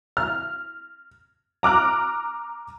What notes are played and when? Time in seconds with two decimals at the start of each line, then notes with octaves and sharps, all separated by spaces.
0.17 F6
1.63 A#5 D6 F6 F#6